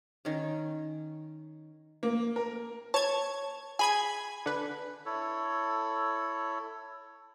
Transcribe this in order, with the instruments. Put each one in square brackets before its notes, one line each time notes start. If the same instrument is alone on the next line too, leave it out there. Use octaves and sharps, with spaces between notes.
[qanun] D#3 C#4
[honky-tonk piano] A#3
A#4
[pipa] C#5 [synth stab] A5 G#6
[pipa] G#4 [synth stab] G#5 B5 G#6
[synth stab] D3 B4
[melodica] E4 A4 C#5